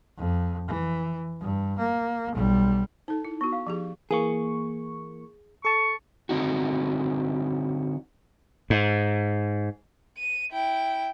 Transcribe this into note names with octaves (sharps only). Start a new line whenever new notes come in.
F2
E3
G2
A#3
B1 G3
D#4 A4 A5
E4
B3 F#4 C#6
F5
F3 G4 G#4
E3 A#3 G#4 C#6
A4 A5 C#6
D3 C4 D#4 F#4
G#2
D#7
E4 G5